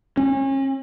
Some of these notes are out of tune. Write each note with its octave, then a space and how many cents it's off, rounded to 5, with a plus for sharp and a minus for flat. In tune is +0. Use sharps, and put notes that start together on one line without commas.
C#4 -35